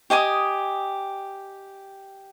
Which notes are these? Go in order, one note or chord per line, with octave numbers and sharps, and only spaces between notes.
G4 D#5 G#5 D#6